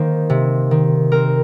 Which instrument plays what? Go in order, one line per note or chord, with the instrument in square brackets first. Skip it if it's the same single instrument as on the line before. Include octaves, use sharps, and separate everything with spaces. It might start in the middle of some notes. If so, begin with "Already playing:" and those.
Already playing: [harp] D#3 A#3 C5
C3
D#3
C4 A#4